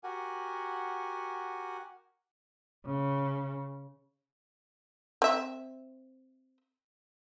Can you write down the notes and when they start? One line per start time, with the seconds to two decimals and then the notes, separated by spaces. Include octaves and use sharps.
0.04 F#4 G4 A#4 F#5 G#5
2.86 C#3
5.22 C4 E5